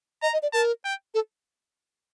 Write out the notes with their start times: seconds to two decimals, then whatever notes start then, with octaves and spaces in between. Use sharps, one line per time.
0.22 D#5 A#5
0.33 D#5
0.43 D5
0.53 A#4 A5
0.85 G5
1.14 A4